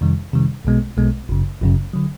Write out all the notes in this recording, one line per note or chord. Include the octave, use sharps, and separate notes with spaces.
F2 C3 D#3 G3
F2 C3 D#3 G3
B1 B2 G#3 B3
B1 B2 G#3 B3
G1 F#2 C#3
G1 F#2 C#3
D3 F#3